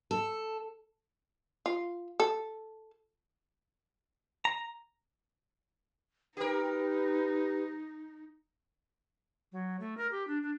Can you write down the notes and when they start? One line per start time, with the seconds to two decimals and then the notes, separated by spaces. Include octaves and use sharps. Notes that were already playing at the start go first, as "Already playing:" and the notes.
0.11 A4
1.66 F4
2.20 A4
4.45 A#5
6.37 D#4 G4 A#4 B4
9.52 F#3
9.80 A3
9.97 A#4
10.11 G4
10.28 D4
10.43 D4